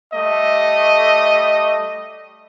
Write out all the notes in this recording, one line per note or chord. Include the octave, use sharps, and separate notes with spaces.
G3 A3 D#5